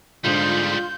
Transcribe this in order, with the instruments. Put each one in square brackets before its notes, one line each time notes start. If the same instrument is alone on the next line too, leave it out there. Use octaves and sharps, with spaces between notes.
[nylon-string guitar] G#2 D3 [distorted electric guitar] G3 G#3 [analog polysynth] F4 [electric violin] G6